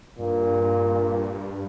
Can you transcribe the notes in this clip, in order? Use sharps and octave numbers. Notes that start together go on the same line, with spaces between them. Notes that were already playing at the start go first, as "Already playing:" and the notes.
G2 A#2